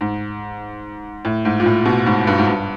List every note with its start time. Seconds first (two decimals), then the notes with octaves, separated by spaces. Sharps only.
0.01 G#2
1.25 A2
1.45 G#2
1.60 A#2
1.66 A2
1.85 B2
2.06 G#2
2.27 G2
2.39 G#2
2.47 G2